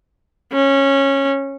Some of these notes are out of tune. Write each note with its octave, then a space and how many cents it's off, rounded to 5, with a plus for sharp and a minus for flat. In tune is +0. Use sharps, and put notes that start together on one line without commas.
C#4 -15